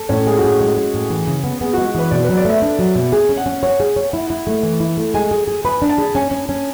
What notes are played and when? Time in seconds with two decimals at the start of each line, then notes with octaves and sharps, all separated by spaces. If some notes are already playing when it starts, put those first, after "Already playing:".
Already playing: A4
0.09 A2 C#4
0.26 G#3 G#4
0.38 F#4
0.43 A2 G#4
0.61 G#3
0.77 G#3
0.94 A2
1.10 E3
1.27 C#3
1.44 B3
1.61 B3 G#4
1.73 F#4
1.78 G#3
1.86 F#4
1.95 E3 B4
2.11 B2 D5
2.24 B4
2.29 F#3
2.37 D5
2.45 A3 E5
2.62 D4
2.79 F#3
2.95 B2
3.12 G#4 G#5
3.29 C#4
3.37 F#5
3.46 C#4
3.63 C#5 F#5
3.80 G#4
3.96 C#5
4.13 E4
4.30 E4
4.47 A3
4.63 E3
4.80 E4
4.97 A3
5.14 G#3 G#5
5.31 G#4
5.48 G#4
5.65 B4 B5
5.82 D4
5.89 A5
5.98 G#4
6.15 C#4 G#5
6.31 C#4
6.49 C#4